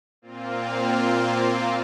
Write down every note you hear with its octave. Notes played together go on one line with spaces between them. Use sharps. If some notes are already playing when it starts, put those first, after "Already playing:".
A#2 A#3 C4 F4